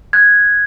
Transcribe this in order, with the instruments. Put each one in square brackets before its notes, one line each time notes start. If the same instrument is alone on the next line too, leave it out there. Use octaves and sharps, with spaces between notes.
[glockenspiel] F#6 G#6